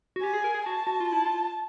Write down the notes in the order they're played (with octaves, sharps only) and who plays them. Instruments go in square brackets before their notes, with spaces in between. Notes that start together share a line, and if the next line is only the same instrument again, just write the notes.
[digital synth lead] F#4
[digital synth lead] G4 [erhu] G#5
[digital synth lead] G#4
A#4
G#4
[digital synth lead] F#4 [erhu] A5
[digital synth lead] F#4
F4
[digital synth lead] E4 [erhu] A5
[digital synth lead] F4